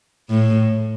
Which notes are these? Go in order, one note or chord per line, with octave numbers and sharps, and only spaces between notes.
A2